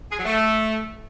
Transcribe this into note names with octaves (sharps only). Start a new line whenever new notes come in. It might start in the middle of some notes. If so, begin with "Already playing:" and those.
G#4
F#3
A3